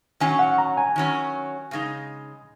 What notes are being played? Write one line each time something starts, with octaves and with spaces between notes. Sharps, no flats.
D#3 F#3 C#4 G#5
F#5
A#5
G#5
D#3 F#3 C#4
C#3 G#3 D#4